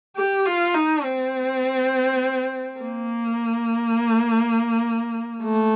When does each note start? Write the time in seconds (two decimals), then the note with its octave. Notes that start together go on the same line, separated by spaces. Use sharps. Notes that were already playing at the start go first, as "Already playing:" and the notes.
0.16 G4
0.45 F4
0.74 D#4
1.04 C4
2.80 A#3
5.43 A3